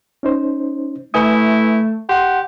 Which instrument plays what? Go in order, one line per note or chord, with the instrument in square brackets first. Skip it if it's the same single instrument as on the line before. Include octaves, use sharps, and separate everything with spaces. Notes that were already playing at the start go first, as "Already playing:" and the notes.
[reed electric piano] C#4 D#4 C5
[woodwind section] A3 [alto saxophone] E4 [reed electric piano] B4 G#5 D#6
[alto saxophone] G4 [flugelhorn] F#5 [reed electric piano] C6